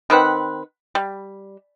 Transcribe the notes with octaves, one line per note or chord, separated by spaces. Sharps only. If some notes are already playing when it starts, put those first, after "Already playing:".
D#3 C4 B4 F#5
G3